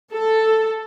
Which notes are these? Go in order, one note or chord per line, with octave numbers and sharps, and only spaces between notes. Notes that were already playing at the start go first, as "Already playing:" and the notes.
A4